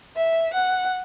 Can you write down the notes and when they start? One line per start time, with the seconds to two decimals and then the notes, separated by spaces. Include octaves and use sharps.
0.16 E5
0.54 F#5